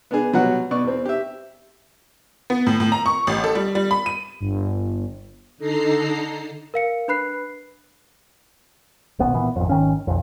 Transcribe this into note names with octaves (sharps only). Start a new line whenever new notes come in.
B3 D4 G#4
B2 F#3 G3 F#4 F#5
B2 D5 C#6
E2 C4
G4 E5
B3
A2
A2
A#5
C#6
A1
A4
G3
G3
B5
D#7
G1
D3 D#4 A4 A#5 C7
A#4 F5 C#7
D4 B4 B5 F#6 C7
D#1 B1 B3
A#2 E3 B3
G#1 F2
G#1 D#3 C#4
B1 F2